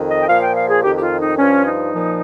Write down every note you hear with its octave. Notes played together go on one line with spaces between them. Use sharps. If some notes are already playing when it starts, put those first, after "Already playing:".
Already playing: F2 D#3
D#5
G5
A#2 F3 F5
G5
F5
G#4
F2 D#3 G4
G4
F4
D#4
G2 F3 C#4
D#4
A#2 F3